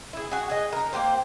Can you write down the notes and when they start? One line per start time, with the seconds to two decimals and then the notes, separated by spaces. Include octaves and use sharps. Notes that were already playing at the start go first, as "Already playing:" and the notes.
0.13 E4 G#4
0.32 F#4 G#4
0.50 G#4 D#5
0.73 D#4 A#4
0.93 A#3 C4 G4 C5